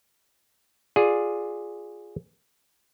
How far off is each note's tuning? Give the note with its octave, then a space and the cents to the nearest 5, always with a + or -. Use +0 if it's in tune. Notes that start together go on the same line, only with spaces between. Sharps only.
F4 +15 G#4 +0 D5 +5